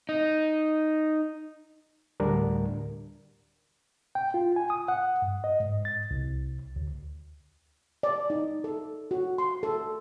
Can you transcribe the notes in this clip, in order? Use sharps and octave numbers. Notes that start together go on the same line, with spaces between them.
D#4
D2 A2 D3 G3 D4 A#4
G5
F4
G#5
D#6
F#5
G2
D#5
G#2
A6
C2
D2
D5
D#4
A4
F#4
C6
A4